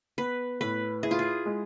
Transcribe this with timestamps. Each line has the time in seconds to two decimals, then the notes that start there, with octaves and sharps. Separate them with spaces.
0.18 B3 B4
0.61 A2 B4
1.03 E4 G#4
1.11 F4
1.19 G#4
1.46 G#3